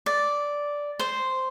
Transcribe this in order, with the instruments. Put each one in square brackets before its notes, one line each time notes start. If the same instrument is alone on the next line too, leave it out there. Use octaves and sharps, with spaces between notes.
[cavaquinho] D5
C5